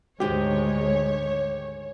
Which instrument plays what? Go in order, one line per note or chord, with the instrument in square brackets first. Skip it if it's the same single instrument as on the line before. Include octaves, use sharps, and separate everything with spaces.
[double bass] D2 G#3 [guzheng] G#2 D#3 [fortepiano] G4 [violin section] C#5